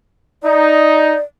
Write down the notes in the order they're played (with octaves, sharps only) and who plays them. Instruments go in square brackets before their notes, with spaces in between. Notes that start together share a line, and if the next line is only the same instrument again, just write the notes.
[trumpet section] D#4 [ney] D5